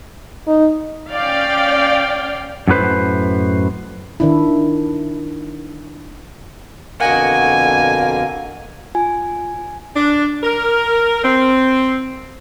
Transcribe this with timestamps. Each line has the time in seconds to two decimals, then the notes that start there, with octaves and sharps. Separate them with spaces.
0.47 D#4
1.10 C#4 D5 F5 G5
2.68 F#2 A2 A#3 B4 C5
4.20 D#3 D4 E4
7.00 F2 B2 D3 A#3 F#4 D#5 F#5 G#5
8.95 F4 G#5
9.95 D4
10.43 A#4
11.24 C4